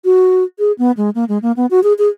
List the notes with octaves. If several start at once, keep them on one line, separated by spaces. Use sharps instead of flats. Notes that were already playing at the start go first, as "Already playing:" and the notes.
F#4
G#4
B3
G#3
A#3
G#3
A#3
B3
F#4
G#4
G#4